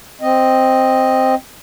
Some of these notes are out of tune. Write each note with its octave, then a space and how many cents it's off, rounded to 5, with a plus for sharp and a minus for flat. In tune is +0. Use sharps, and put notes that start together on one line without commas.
C4 +0 D#5 +0